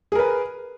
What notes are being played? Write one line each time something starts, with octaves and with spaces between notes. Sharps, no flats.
G#4 A#4 B4